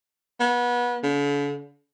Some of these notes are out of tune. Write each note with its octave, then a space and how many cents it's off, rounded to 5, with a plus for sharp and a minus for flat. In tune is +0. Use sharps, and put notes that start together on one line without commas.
B3 -25
D3 -45